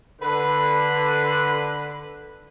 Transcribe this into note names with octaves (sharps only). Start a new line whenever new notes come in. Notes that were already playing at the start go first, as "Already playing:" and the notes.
D3 B4